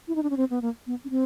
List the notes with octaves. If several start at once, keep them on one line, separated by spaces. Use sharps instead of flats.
E4
D#4
D4
C#4
C4
B3
A#3
B3
C#4
C4